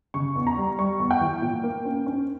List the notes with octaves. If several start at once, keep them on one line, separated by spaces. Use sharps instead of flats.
C#3 C#6
E2
A#5
G3
G3 C#6
E2
G5
E3
A#2
A#3
C#4
C#4